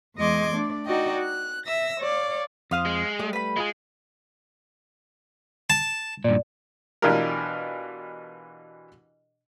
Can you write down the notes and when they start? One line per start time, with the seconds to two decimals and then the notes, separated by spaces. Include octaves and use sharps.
0.17 E2 G#3 D#5 C6 D6 G#6
0.53 A3 D4 D5
0.86 D#4 F#4 D5 D#5 G5
1.19 F#6
1.66 E5 E6 A#6
2.00 C#5 D5 F5
2.71 F2 C5 F5 D#6
2.85 G#3
3.19 G3 A3 D#6
3.33 B4 B5
3.56 G#3 E4 F4 G#4
5.70 A5
6.24 G2 A#2 D5
7.02 B2 E3 D4 F4 G4 A#4